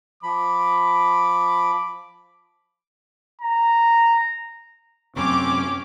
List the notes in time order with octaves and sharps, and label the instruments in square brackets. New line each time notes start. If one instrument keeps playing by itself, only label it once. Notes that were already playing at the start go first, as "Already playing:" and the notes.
[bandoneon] F3 B5 [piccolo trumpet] D6
[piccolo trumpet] A#5
[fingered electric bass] F#2 C3 [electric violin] C4 C#4 [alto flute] C#6 [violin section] D6